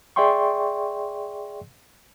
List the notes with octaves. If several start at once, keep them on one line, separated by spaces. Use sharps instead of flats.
G#4 D5 E5 G5 C6 C#6